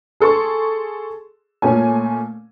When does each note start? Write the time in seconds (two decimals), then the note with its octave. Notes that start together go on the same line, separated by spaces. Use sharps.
0.20 G#4 A4 C6 C#6
1.62 A#2 A3 C#4 G#5